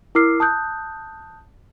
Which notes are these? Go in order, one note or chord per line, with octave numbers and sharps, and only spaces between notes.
E4 A#4 D6 E6 F6 C7
A5 D#6 F#6 G6